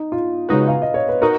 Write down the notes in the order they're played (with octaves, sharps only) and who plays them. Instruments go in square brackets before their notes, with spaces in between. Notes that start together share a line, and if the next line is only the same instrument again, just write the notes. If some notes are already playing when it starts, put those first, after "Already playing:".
Already playing: [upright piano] D#4
F4
[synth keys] C#3 G#3 D#4 F#4 [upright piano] B4
[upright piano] F5
D#5
C#5
B4
[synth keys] D#4 F#4 [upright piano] A#4